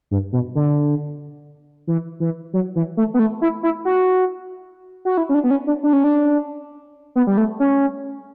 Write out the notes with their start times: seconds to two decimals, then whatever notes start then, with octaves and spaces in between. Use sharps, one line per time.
0.11 G2
0.33 B2
0.55 D3
1.87 E3
2.20 E3
2.53 F#3
2.76 E3
2.97 A3
3.14 B3
3.19 A3
3.42 E4
3.63 E4
3.85 F#4
5.05 F#4
5.17 E4
5.29 C#4
5.34 D4
5.44 B3
5.51 C#4
5.67 D4
5.83 D4
5.93 C#4
6.04 D4
7.16 B3
7.27 G3
7.37 A3
7.60 C#4